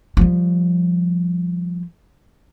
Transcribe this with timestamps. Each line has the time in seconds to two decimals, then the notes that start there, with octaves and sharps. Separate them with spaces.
0.17 F3 G3